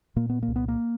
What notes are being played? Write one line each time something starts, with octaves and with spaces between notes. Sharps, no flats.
A#2 A#3
B3
A#3
C2
B3
A#3